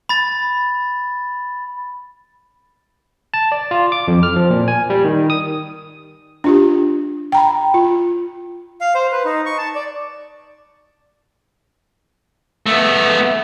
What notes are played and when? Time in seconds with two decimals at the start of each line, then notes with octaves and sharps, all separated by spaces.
0.09 B5 A6
3.34 A5
3.52 D5
3.71 F4
3.92 D6
4.08 F2
4.23 F6
4.36 F3
4.50 A#2
4.68 G#5
4.90 G3
5.05 D#3
5.30 D#6
6.44 D4 F4 G4
7.32 G5 A#5 B5
7.74 F4
8.81 F5
8.95 C5
9.12 B4
9.25 D#4
9.46 C#6
9.58 A5
9.75 D5
12.66 A3 B3